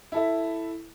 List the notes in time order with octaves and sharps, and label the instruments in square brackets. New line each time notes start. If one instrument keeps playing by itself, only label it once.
[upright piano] E4 A4 E5